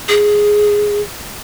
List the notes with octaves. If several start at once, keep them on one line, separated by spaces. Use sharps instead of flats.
G#4